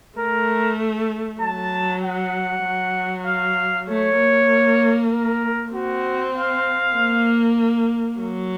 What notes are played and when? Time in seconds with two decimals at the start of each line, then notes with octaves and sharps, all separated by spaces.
0.19 A3 A#4
1.42 F#3 A5
2.03 F#5
2.65 F#3
3.27 F5
3.88 A3 C#5
4.19 A#3
5.12 A#4
5.73 C4 F#4
6.35 F5
6.96 A#3
8.20 F#3